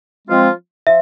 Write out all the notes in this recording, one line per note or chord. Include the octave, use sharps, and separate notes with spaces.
F3 G#3 C4 F4
F3 E5